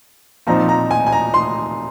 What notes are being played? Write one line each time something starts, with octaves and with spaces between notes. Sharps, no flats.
A#2 F3 C4 D#4 A#5
A#5
G#5
G#5
A#5
C6